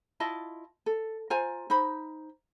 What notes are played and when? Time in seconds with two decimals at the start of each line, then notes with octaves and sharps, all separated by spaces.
0.20 E4 F4 D#5 A5
0.86 A4
1.30 F4 C5 G#5 A#5
1.70 D#4 C5 B5